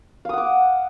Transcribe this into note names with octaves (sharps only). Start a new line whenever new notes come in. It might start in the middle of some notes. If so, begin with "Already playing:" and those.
F5 F#5 D6 D#6